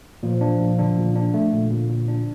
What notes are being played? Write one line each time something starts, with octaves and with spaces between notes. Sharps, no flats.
A#2 F3
D4
A#2
D3 D4
A#2
D4
A3
A#2
A#2
A#2
D4